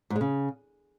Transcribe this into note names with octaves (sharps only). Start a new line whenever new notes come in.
G#2
G#3
C#3